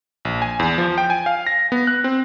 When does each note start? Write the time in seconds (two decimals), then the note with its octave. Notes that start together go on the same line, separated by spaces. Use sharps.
0.25 A#1
0.42 G#5
0.59 E2
0.78 F3
0.98 G5
1.10 G#5
1.26 F5
1.47 A#6
1.72 B3
1.87 F#6
2.04 C4